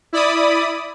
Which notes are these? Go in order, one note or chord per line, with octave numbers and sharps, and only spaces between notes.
E4 D5 B5 D#6